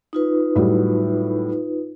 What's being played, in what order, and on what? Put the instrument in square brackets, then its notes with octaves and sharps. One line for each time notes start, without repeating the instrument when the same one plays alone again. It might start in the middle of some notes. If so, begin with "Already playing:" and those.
[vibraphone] D#4 F4 B4
[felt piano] A2 F#3 G3